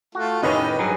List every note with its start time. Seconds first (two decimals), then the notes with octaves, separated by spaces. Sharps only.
0.15 A3 F4 F#4
0.43 A2 D#3 C#4 D#4 G4 B4 D#5
0.79 G2 F#3 G#4